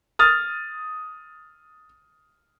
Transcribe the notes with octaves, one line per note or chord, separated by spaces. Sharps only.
D#6 F6 A6